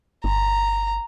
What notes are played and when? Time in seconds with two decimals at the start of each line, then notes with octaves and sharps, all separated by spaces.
0.24 G1 A#5